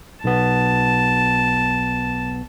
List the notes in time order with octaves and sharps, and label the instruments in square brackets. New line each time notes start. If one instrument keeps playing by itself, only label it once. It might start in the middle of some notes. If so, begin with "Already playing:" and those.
[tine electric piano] B1 B3 [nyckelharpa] A5